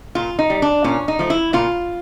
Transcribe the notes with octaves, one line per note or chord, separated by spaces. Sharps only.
A#2 F4
D#4
G3
D4
A#2 C#4
D#4
F3 A3
E4
A#2 F4